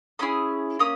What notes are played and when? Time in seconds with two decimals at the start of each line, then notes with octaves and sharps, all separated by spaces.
0.19 A#3 C#4 E4 G#4 D#6
0.79 A#3 C#4 D#6